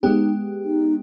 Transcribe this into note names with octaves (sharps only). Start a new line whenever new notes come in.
G#3 B3 D#4 G4
D#4